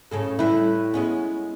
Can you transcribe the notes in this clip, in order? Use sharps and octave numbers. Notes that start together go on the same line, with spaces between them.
A2 C#3 A4
A2 G3 E4 B4
G#3 B3 C#4